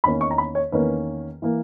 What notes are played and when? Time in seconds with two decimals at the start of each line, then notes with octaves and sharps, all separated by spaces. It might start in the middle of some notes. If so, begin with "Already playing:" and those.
0.04 E2 D#3 A#3 C#4 B5
0.21 C#6
0.31 A#5
0.38 B5
0.55 C#5
0.72 E2 D#3 A#3 C#4 B4
1.42 E3 A#3